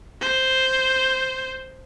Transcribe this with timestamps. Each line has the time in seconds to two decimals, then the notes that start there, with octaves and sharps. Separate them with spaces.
0.21 C5